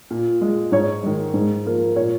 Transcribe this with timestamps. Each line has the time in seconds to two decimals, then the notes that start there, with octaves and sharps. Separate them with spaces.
0.11 A#2
0.41 G#3
0.72 G#2 C#5
1.03 D#3 G#3
1.34 G#2
1.65 F3 A#3
1.96 A#2 C#5